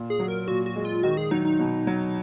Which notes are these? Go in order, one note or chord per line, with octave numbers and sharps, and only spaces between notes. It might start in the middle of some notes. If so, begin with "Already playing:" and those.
Already playing: A#2
G#4
F#3
A#4
A#2 F#4
F#4
G#3
F4
D#3 F#4
G#4
F#3 D#4
D#4
B2
F#3